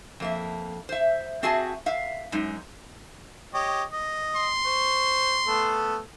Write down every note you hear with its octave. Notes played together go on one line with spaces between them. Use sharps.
F2 A#3 E5
C5 E5
C4 F#4 G#4 E5 G#5 A5
E5 F5
F#2 G#3 D#4
G4 C#5 D#5
D#5
C6
C5 C#6
A3 B3 A4